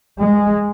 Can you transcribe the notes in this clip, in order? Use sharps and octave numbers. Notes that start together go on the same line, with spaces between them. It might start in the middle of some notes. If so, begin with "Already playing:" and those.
G#3